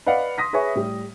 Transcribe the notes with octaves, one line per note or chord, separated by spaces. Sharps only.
B4 D5 D#5 F5 F#5
C6 D#6 A#6 B6
G#4 B4 C#5 E5 G#5 C#6
A2 G3